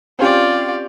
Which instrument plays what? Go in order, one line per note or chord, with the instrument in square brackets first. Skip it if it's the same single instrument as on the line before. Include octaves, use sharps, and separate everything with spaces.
[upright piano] C4 C#4 G4 [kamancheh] F4 D5